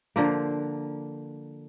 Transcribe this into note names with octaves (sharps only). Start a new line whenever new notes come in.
D3 F3 A#3